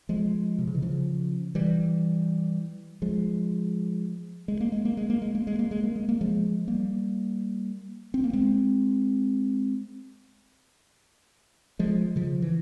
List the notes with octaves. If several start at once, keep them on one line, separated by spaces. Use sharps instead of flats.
F3 G#3
C3
C#3
E3
C#3 F3
E3 G3
F3 G#3
G#3
A#3
G#3
A#3
G#3
A#3
G#3
A#3
G#3
A#3
G#3
A#3
G#3
A#3
F3 G#3
G3 A#3
C4
A#3
G#3 C4
F3 G#3
C#3 F3
E3